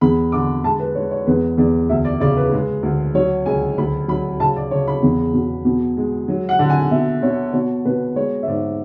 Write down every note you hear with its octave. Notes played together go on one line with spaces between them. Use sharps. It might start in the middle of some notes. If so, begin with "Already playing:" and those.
E2 B5
D3 D6
G#3 A5
B4
G#3 C#5
C#5
E2 B4
E2 D5
D2 E5
D5
C#3 D5
B4
G#3
D2
F#3 C#5
C#2 G#5
D2 B5
F#3 B5
C#3 A5
D5
C#3 C#5
B5
E2
B2
B2
G#3
F#3
F#5
D3
G#5
B2 E5
B2 C#5
B2 C#5
B2 B4
G#3 C#5
E5
G#2 D5